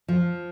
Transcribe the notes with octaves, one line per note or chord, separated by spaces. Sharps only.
F3